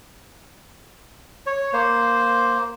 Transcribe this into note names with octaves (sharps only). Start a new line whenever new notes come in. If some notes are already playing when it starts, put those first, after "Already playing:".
C#5
A#3 C5